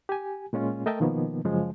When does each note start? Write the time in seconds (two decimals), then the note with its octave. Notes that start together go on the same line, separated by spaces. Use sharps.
0.09 G4 G#5
0.53 A#2 G#3 C#4 F4
0.86 A3 A#4 D#5 E5 G5 A5
1.00 B2 D#3 F3 A#3 B3
1.45 F#2 C#3 F3 G#3